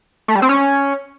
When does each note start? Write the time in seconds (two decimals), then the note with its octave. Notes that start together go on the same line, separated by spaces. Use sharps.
0.28 A3
0.35 G3
0.42 C4
0.49 C#4